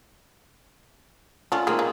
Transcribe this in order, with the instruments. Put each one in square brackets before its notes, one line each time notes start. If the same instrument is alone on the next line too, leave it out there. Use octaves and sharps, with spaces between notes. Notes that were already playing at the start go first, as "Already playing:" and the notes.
[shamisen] D3 C#4 D4 [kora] F4
[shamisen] D#3 C4 [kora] A#3 G#4
[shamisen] G#3